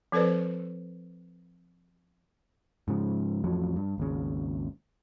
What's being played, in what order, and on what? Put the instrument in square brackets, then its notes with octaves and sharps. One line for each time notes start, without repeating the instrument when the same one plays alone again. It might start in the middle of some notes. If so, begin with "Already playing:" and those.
[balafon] F3 C4 A4 B4 C5 D5
[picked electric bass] G#2 C#3 F3
A1 F2 F3 F#3
G2
G#1 D#2 C#3